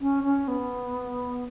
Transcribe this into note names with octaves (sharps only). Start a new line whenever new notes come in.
C#4
C#4
B3